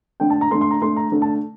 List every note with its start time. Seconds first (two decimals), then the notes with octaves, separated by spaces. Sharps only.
0.20 D3 A3 G5
0.30 A5
0.41 A#5
0.51 D3 A3 C6
0.61 C6
0.71 A#5
0.81 D3 A3 C6
0.96 A#5
1.12 D3 A3
1.22 A5